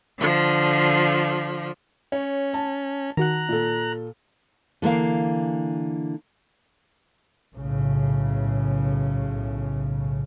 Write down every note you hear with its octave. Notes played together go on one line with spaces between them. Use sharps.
D3 F3
C#4 C#5
A5
D#3 F#4 F#5 A#5 F#6
A#2 A4
D3 E3 A#3 F5
B1 A2 C#3